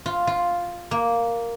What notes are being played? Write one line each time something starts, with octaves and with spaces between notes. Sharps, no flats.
F4
F4
A#3